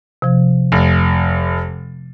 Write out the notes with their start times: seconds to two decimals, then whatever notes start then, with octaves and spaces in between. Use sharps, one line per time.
0.22 C3 F3
0.72 F1